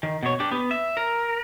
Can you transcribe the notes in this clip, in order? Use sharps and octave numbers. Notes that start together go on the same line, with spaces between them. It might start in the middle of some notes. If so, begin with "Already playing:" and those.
D#3
B2 C#5
D4 G4
B3
E5
A#4